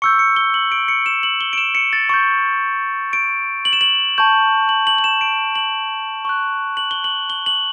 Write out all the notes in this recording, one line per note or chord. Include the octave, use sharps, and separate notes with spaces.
C#6 E6 G6 C#7
C#7
G7
F#7
D7
C#7
E7
F#7
G7
D7
E7
C#7
A6
C#6 G6
D7
F#7
E7
F#7
A5 C#6 G6
F#7
F#7
F#7
E7
D7
F#7
C#6 F#6
F#7
G7
F#7
G7
F#7